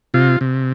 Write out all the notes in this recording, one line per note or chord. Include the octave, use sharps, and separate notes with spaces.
C3 F4
C3